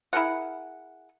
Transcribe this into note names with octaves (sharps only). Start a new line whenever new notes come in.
E4 G#4 A#4 F#5